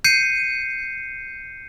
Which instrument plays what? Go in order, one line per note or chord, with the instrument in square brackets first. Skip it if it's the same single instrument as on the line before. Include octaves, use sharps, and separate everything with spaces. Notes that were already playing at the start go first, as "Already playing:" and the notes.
[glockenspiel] G6 C7 C#7 D#7